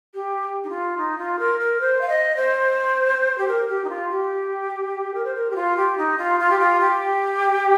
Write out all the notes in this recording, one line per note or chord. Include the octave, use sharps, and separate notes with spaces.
G4
D#4
F4
D#4
F4
A#4
A#4
C5
F5
D#5
C5
G4
A#4
G4
D#4
F4
G4
A#4
C5
A#4
G4
F4
G4
D#4
F4
F4
G4
F4
G4